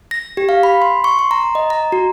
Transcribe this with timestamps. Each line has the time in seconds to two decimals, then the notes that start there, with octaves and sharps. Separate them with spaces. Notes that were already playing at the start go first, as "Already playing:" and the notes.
0.11 A#6
0.37 G4
0.49 F5
0.63 B5
0.82 C6
1.04 C#6
1.19 C6
1.31 A#5
1.55 D#5
1.70 A#5
1.92 F#4